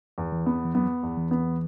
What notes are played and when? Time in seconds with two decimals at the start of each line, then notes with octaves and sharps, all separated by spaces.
0.18 E2
0.32 E3
0.46 B3
0.65 E3
0.74 F#3 B3
1.03 E2
1.17 E3
1.31 B3